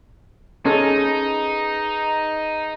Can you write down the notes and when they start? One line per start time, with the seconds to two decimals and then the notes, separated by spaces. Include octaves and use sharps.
0.65 C#4 D#4 G#4 A4 B4 C6